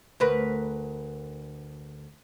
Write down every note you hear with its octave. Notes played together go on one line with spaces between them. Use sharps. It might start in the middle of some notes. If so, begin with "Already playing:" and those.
D2 A#4 B4